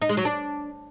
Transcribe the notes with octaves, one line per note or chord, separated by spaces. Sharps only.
D#4
G#3
F#3
D4